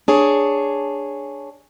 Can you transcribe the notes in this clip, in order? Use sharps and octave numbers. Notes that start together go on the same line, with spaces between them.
D4 G#4 C#5